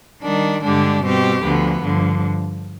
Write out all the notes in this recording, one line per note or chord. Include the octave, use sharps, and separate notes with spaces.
D#3 G3 D4
G2 D3 G#3 D4 G4
B2 G3 C4 G4
D2 D3 F3 B3
G2 D3 F3